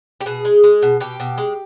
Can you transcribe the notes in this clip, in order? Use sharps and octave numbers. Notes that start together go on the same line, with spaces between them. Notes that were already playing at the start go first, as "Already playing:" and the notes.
G4
B2 G#4
G#3
G#3
B2
B2 G4
B2
G#3